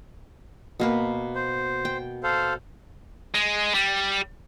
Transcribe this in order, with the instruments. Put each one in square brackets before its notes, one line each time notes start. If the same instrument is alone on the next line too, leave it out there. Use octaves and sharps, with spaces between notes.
[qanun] B2 A#3 B4
[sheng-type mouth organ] C5
[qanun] G5
[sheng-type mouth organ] A4 C5 F5
[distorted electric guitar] G#3
G3